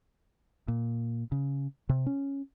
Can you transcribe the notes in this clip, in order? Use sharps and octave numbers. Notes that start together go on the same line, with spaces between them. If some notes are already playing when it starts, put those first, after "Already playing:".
A#2
C#3
C3
C#4